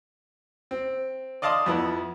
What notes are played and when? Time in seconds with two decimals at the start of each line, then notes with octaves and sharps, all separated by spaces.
0.71 C4
1.42 D5 D#5 F5 A5 C6 D#6
1.66 F2 B3 E4